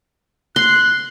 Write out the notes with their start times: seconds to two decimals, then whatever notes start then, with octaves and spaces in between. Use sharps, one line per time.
0.56 C6 F#6